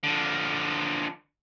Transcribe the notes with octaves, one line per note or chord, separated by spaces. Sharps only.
D3 F3